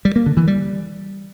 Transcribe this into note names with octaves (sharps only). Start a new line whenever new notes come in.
G3
A#3
D3
E3
G3